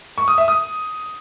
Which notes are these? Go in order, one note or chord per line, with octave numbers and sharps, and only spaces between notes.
C#6
D#6
E5
D#6